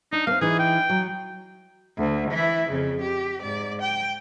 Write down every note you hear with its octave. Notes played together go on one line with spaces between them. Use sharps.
D4 D#4
A#3 C4 F5
E3 D#4 G#4
G5
F#3
D2
E3 E4
F2 C#3
G4
G#2 D5
G5